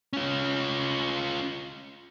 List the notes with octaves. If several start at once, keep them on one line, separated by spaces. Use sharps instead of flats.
C#4 F4